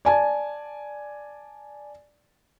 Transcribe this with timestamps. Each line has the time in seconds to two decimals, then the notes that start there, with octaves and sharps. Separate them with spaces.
0.05 D5 G#5 A5